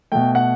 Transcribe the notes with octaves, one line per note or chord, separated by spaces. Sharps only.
B2 A3 G5
F#5